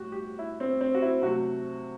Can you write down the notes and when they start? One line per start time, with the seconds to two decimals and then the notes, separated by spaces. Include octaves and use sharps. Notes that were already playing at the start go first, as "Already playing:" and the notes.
Already playing: A2 G3 F#4 G4
0.12 G4
0.39 E4
0.60 C4
0.81 C4
0.94 F#4
1.02 E4
1.22 C3 F#3 A3 F#4